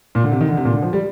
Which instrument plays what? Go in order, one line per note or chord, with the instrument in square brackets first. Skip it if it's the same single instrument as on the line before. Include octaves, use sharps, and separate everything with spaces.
[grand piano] A#2
D3
C3
D#3
D3
C3
A#2
D3
F3
G3